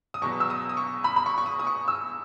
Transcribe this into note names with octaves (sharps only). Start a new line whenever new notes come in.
D#6
E2 B2 F#3 B3 C#6
E6
D#6
D#6
C#6
B5
B5
C#6
C#6
D#6
D#6
C#6
E6